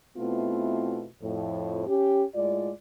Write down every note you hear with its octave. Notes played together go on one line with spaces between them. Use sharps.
B2 A3 B3 C4 E4 F4
F2 A2
C#4 G4
A2 G#3 F4 D5